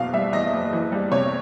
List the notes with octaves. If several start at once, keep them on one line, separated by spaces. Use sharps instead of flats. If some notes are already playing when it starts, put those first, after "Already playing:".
Already playing: F#1 E2 B2 F5
G3 E5
E2 D#5
F#1
E3
G3
C3 C#5